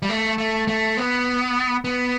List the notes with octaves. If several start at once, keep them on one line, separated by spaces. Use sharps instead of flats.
G3
A3
A3
A3
B3
B3